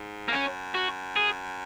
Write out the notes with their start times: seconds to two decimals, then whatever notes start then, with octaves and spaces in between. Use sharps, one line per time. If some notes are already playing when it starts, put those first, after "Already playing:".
Already playing: G#2
0.28 A#3
0.32 F#2 C#4
0.75 F#4
1.16 G#4